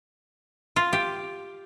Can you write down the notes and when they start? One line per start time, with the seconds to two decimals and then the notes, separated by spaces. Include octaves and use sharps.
0.76 F4
0.93 G4